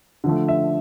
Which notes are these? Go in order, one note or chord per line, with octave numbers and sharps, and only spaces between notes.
D3 F3 A3
E5